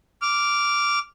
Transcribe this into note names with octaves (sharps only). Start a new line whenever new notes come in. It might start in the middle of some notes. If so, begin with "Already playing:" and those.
D6 F6